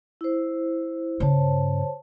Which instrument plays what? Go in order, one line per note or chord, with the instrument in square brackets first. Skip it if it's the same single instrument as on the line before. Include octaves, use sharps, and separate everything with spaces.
[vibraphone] E4 C5
[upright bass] G2 C#3 [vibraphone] C5 C#5 A5